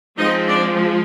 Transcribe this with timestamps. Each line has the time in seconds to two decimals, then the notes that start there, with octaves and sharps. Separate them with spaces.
0.18 F3 G#3 C4 D#4 D#5
0.48 D4 D5